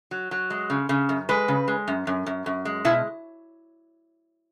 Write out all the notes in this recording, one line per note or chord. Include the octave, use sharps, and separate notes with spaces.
F#3
F#3
G#3
C#3
C#3
F#2
G#3 B4
C#3
G#3
F#2
F#2
F#2
F#2
G#3
B2 E4